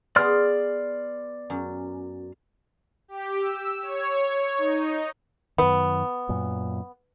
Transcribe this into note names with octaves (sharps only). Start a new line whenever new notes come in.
B3 G#4 D5 C6 F6
F#2
G4
E6
C#5
D#4
F#2 D#3 B3
F#2 A#2